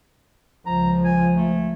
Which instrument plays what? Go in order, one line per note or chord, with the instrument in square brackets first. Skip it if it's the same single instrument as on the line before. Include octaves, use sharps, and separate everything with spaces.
[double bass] C#2 F3 [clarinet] A#5
[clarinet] G#5
A3